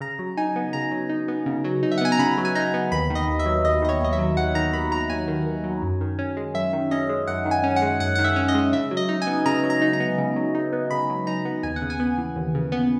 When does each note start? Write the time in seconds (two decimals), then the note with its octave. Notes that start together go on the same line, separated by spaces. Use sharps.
0.01 C#3 A#5
0.19 F#3
0.37 D#4 G#5
0.56 B3
0.73 C#3 A#5
0.91 F#3
1.09 D#4
1.28 B3
1.46 C#3
1.64 F#3
1.83 D#4
1.92 E5
1.98 F#5
2.01 B3 G#5
2.12 A#5
2.19 C#3 B5
2.38 F#3
2.45 G#5
2.55 D#4 A#5
2.74 B3
2.92 D#2 B5
3.10 D#3
3.15 D#5
3.28 D#2
3.39 E5
3.46 F#3
3.65 D#2 D#5
3.82 D#3 D#5
3.89 C#5
4.01 D#2 D#5
4.13 E5
4.19 F#3
4.37 D#2 F#5
4.55 D#3 A#5
4.73 D#2 B5
4.92 F#3 A#5
5.10 D#2 G#5
5.28 D#3
5.46 D#2
5.64 F#3
5.82 F#2
6.01 D#3
6.19 C#4
6.37 G#3
6.54 F#2 E5
6.73 D#3
6.91 C#4 D#5
7.09 G#3
7.27 F#2 F#5
7.45 D#3
7.51 G#5
7.64 C#4
7.76 F#5
7.82 G#3
8.00 F#2 F#5
8.15 D#3 F#5
8.24 E5
8.36 C#4
8.48 D#5
8.55 G#3
8.73 C#3 E5
8.91 F#3
8.97 D#5
9.09 D#4
9.22 G#5
9.27 B3
9.46 C#3 A#5
9.64 F#3
9.70 A#5
9.82 D#4
9.93 A#5
10.00 B3
10.18 C#3
10.36 F#3
10.55 D#4
10.73 B3
10.91 C#3 B5
11.10 F#3
11.27 D#4 A#5
11.45 B3
11.63 D#2 G#5
11.76 F#5
11.82 C#3
11.90 G#5
12.00 B3
12.18 E3
12.36 D#2
12.54 C#3
12.72 B3